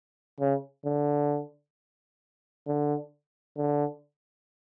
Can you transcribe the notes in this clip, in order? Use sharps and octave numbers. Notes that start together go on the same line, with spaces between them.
C#3
D3
D3
D3